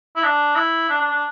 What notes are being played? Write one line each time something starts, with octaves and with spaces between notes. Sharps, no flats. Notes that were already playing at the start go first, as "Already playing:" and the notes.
E4
D4
E4
D4
D4
D4